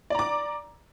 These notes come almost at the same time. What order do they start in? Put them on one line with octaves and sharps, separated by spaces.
D5 A#5 D6